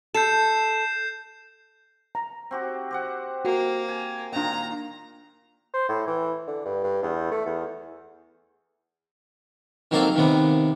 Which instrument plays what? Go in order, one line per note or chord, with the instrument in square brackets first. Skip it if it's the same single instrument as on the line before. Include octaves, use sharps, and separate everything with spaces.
[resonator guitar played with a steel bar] A4 [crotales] G6 C7 E7
[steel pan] A#5
[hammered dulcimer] C4 F#4 G4
G4 C5 F#5
[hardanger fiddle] A#3 [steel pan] F#4
[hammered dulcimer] G#5
[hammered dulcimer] A#2 D#3 F4 [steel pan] D4 G5 [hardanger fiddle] A#5
[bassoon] C5
A2
E3
D3
G2
G2
E2
A3
E2
[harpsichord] D#3 F#3 A#3 C4 A4 F5
D#2 C3 B3